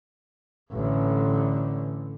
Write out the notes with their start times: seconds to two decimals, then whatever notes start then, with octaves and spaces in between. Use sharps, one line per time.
0.73 A1 D3